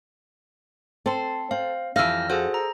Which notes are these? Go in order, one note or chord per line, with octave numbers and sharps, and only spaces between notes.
C4 A4 C5
C4 F5
F2 E3 G3 F5 E6 F6 A#6
F#4 G#4 A4 C5
A#5